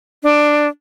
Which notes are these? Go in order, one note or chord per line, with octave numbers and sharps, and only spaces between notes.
D4